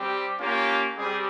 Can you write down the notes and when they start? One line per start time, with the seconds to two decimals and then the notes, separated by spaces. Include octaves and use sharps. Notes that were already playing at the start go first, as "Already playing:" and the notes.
Already playing: G3 C4 G4
0.40 A#3 C#4 F4 G4
0.96 G3 C4 G4 G#4